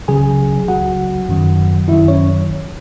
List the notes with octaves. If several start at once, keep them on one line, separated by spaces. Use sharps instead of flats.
C#2 C#3 F#3 G#4 G#5
C#2 C#3 F#3 F#4 F#5
F#2 D#3 F#3
F#2 D#3 F#3 E4 E5
C#4 C#5